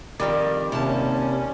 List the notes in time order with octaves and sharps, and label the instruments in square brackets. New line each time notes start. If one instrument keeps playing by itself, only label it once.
[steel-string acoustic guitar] F2 D#3 [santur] G3 D5
[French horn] D#2 [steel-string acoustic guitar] C3 A5 [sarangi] C#4